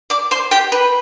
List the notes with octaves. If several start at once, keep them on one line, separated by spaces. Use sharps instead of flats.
D5 D6
C5 C6
G4 G5
B4